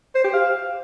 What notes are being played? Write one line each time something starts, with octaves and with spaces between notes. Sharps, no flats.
C5
G4
F5